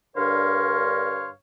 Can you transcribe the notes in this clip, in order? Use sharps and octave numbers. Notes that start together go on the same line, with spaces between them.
G2 D3 A#4 C#5 F5 C6